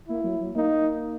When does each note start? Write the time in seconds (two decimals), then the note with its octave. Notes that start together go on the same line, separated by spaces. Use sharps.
0.09 A#3 E4
0.24 F#3
0.40 F#3
0.56 A#3 D#4